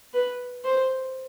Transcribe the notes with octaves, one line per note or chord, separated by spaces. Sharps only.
B4
C5